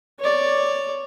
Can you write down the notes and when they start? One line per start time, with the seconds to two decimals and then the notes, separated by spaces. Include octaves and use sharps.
0.20 C#5 D5